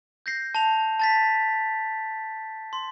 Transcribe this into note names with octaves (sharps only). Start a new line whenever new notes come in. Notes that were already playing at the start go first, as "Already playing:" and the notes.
G6 A#6 C7
A5 C7 F7
A5 A6 B6
C6